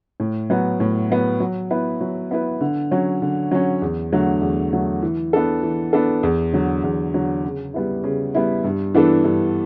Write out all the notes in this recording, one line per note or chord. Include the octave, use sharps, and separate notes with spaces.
A2
F#3 B3
A2
F#3 B3
F#3
B3 E4 B4
F#3
B3 E4 B4
D3
F#3 C#4
D3
F#3 C#4
E2
D3 F#3 A3
E2
D3 F#3 A3
E3
B3 D4 A4
E3
B3 D4 A4
E2
D3 F#3
E2
D3 F#3
C#3
G3 B3 E4
C#3
G3 B3 E4
G2
E3 B3 D4 A4
G2